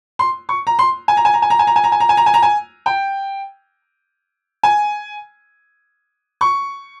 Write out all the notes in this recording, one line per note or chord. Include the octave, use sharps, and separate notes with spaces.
C6
C#6
A#5
C6
G#5
A#5
G#5
A#5
G#5
A#5
G#5
A#5
G#5
A#5
G#5
A#5
G#5
A#5
G#5
A#5
G#5
G5
G#5
C#6